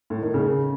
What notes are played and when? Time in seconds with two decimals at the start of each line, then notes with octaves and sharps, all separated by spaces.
0.10 A2
0.22 D#3
0.34 C#3